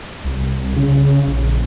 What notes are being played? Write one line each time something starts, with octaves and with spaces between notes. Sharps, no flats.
C2
C#3
A#1